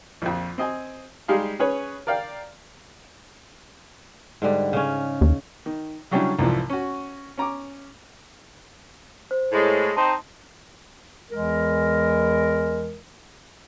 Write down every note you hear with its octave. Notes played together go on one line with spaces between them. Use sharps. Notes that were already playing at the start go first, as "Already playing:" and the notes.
A#1 F2
C4 D#5 G#5
G3 G#3 D#4 G4 G#4 F5
C#4 G#4 B4 C#5
A#4 D5 F5 G5
G#2 D3 G3
C#3 C#4
D#2
D#3
C#3 F#3 G3 C#4 D4 E4
C2 G#2 E3 F3
C#4 F#4
C#4 A#5 D6
C5
A2 G#3
C4 D#4 A5 C6
E2 E3 G#3 A#4